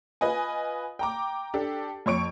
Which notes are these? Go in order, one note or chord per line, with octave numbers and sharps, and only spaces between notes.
F4 B4 D#5 G#5
G5 A#5 D6
D4 G4 A4
F2 C#5 C#6 D7